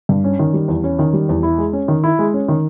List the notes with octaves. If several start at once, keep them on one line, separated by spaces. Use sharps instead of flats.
G2
C#4
D#3
G3
E2
C#4
D#3
G3
E2
E4
G#3
C#4
D#3
E4
G#3
C#4
D#3